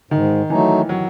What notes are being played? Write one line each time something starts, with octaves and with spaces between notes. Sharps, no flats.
G#2 D#3
E3 F#3 A3 D#4
F#3